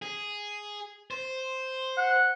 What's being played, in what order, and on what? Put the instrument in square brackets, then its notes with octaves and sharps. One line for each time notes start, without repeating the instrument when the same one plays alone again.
[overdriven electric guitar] G#4
C5
[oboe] F#5